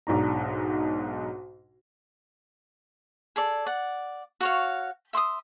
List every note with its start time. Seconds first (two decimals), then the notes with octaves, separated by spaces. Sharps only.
0.07 B1 G#2 D4 A#5
3.36 G#4 A4 D5
3.66 D5 F#5
4.41 F#4 C#5 F5
5.13 E5 C6 D6 D#6